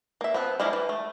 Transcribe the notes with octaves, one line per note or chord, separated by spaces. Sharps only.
A#3 E5
F3 B3 C4
F3 G3 G#3 A#3 E4
E3
A3